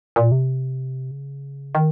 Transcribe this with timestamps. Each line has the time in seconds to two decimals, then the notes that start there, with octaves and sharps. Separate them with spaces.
0.16 A#2
0.32 C3
1.11 C#3
1.75 D#3